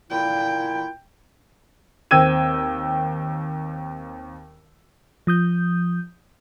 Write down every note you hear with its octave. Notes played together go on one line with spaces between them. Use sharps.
A#2 E4 G5
D#2 C4 G5 E6 G#6 D#7
F3 D#6 G6